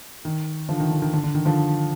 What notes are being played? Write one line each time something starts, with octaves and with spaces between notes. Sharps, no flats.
D#3
D3 F3
D#3
D3
D#3
D3
D3
D#3
D3 F3